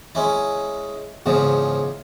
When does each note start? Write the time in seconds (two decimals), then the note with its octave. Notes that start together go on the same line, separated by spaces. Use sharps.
0.15 G#3 C#4 E4
1.26 E2 G#2 C#3 F3